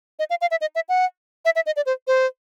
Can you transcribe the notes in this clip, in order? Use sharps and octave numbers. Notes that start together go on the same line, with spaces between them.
D#5
F5
F5
E5
D#5
E5
F#5
E5
E5
D#5
D5
C5
C5